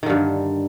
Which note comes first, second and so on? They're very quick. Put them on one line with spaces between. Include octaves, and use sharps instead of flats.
D#3 D3 G2